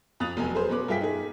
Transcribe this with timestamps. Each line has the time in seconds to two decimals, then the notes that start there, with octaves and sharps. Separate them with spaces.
0.20 F2 D#6 F#6 A6 F7
0.37 F1 E2 F#3 G#5
0.55 G#4 B4 C5
0.69 B2 C#4 B4 D6 F#6
0.88 G2 F4 G#4 E5 G5 B6
1.01 D#4 G#4